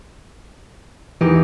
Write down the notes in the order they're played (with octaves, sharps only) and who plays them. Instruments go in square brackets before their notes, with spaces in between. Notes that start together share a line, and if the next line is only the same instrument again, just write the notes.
[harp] E2 D#4 G4 [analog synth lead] E3